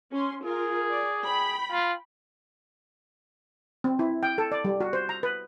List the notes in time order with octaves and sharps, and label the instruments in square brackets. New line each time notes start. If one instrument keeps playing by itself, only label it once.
[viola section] C#4 C6
[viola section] F4 A#4 [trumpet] G#4
[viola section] D5
G5 B5
[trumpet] F4
[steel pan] C4
E4
G5
A4
D5
G3
F#4
C5
A#5
B4